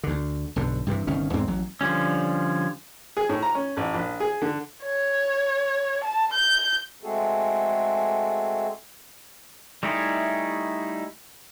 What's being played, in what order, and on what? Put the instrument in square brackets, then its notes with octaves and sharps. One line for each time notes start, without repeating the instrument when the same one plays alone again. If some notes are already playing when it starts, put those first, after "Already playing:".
[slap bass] D2 D3
B1 G2 D3
G2 C3 D#3 E3
G1 C2 D#3 C#4
E2 G#2 E3 C4
A1 F#3
[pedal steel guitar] D3 F3 G3 C#4
[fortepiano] G#4
A2
A#5
C#4
A1
A#1
G#4
D3
[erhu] C#5
A5
G6
[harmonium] G#3 A3 C4 F#4 G#4 A4
[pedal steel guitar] G3 A3 D#4 E4 G#4